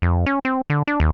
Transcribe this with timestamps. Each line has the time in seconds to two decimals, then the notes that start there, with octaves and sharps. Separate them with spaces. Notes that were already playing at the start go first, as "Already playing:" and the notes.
0.02 F2
0.26 C#4
0.45 C4
0.70 D3
0.87 D4
1.00 D#2